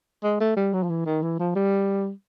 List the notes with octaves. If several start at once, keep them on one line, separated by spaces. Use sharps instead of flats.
G#3
A3
G3
F#3
F3
E3
D#3
E3
F3
G3